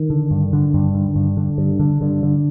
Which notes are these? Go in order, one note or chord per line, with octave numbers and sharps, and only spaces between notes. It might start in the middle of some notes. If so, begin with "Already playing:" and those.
Already playing: D#3
D3
G2
D3
G2
D3
G2
D3
G2
D3
G2 D3
D3